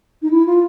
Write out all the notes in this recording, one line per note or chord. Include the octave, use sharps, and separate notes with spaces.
D#4
E4
F4